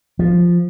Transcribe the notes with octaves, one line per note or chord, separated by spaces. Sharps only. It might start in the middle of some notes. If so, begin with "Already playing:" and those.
F3